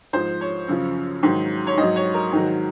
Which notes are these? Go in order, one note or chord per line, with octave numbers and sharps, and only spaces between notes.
G#2 F3 C5
C#5
F#2 C#3 F3
G#2 D#3 F#3
C#5
G#2 F#3 D#5
C#5
A#4
G#2 D#3 F#3